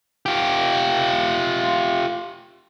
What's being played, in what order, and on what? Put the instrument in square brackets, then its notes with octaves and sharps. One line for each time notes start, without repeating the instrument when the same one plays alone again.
[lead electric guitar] F4 G4